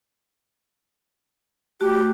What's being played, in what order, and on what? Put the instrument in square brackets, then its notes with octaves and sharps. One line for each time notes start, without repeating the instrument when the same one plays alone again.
[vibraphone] A3 F#4 [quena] G4